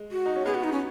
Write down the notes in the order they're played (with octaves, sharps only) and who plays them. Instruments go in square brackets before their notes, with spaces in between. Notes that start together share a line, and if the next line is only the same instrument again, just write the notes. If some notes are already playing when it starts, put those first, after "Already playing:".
Already playing: [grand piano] G#3
[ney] F#4
[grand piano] D#4
C#4
[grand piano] B3 [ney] G#4
[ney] F#4
D#4
C#4